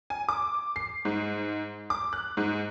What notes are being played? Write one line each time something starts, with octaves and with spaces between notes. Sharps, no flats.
G#5
D6
C7
G#2
D6
F#6
G#2